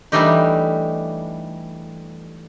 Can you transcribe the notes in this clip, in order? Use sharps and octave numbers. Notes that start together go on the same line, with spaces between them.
E3 G3 A3 D4 D#4 G4